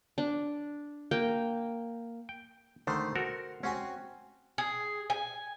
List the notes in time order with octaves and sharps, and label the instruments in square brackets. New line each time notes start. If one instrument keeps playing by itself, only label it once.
[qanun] D4
A#3 G5
[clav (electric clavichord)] G5
[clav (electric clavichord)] D3 D#3 A3 [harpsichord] C5 C6
[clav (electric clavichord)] F#4 A4 A#4
[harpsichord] C4 F#4 G#5 [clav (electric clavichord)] C#4
[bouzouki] G#4
G#5